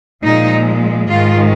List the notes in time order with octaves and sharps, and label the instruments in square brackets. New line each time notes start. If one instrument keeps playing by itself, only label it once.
[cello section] A#2 F3 G#3 D#4
G#2 D#3 G#3 F4